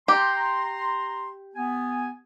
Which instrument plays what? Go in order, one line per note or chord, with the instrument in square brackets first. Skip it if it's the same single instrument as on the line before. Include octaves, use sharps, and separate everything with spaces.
[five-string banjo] G4 [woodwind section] A#5 C6
[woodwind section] B3 G#5